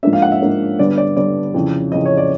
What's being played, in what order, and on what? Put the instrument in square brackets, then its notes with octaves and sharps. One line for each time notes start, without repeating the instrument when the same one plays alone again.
[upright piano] G#2 F3 A#3 D4 E5
F5
F#5
E5
G#2 F3 A#3 D4
G2 D3 G3 B3 D5
D5
G2 D3 G3 B3 D5
F2 C#3 E3
F2 C#3 E3 D#5
C#5
D5